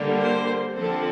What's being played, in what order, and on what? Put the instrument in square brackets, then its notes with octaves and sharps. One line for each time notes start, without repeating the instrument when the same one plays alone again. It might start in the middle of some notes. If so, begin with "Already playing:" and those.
Already playing: [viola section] D3 G3 A#3
C5
D3 F3 C4 A4